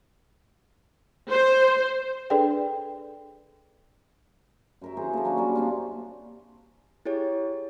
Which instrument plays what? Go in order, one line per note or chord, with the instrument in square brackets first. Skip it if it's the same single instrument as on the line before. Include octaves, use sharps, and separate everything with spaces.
[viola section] C5
[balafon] D4 G#4 A4 B4 D5 G5
[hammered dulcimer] F#2 A#4 E5
E4 G#4 A#4 C5
A#3 A4
F#3 A#3 C#4 D4
G3 A#3 A#4
C4 D4 F4
[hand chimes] E4 G4 G#4 C#5